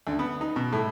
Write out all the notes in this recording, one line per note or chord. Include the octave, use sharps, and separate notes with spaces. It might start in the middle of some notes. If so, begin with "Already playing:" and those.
D2
B3
D#4
B2
A2